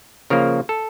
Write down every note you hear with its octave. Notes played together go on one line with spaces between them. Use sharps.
C#3 F3 A#3 A#4
A4